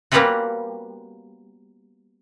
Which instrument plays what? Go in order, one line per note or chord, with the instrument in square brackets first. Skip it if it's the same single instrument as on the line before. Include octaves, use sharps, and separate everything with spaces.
[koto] G3 A#3 B3 C#4 F4 F#4